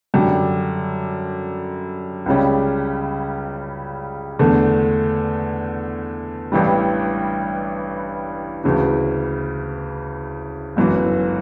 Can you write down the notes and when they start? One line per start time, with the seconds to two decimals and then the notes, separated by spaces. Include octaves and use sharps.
0.14 F#2 D3 G3
2.26 C#2 C#3 G3 C#4
4.39 E2 D3 A3
6.52 A1 G2 E3 G3
8.64 D2 C#3 E3
10.76 G1 F#2 E3